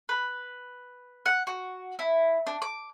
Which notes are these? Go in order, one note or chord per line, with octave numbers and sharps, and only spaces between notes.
B4
F#5
F#4
E4
D4
D6